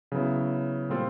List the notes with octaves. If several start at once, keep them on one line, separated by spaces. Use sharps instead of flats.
C#3 F#3 B3 E4
A#2 G3 C4 F4 A4